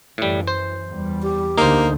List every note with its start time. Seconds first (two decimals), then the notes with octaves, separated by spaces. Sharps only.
0.18 F#2 A2 E3 G3
0.47 C5
0.89 E2 G3
1.22 G4
1.58 D2 D3 A#3 D#4 C5